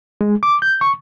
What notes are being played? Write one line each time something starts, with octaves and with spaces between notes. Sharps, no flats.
G#3
D6
G6
C#6